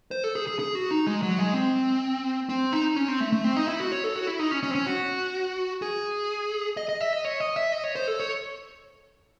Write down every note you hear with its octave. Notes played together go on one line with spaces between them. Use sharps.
C5
A4
G#4
G#4
G#4
F#4
D#4
G#3
F#3
G#3
C4
C4
D#4
C#4
C4
A3
A3
C4
D#4
E4
F#4
C#5
A4
F#4
E4
D#4
C#4
C#4
C4
C#4
F#4
G#4
D#5
D#5
E5
D#5
C#5
D#5
E5
D#5
C#5
C5
A4
C#5